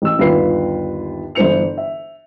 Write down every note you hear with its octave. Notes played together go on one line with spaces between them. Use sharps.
A1 E6
G1 D#2 F4 B4 C7
G1 E3 E4 C5 C#7 F7
E5